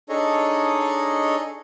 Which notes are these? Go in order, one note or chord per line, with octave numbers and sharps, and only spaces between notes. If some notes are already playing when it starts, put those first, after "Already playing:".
D4 D#4 G#4 A4 C#5 D#5